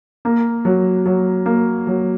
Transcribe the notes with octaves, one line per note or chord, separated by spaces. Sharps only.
A#3
F#3
F#3
A#3
F#3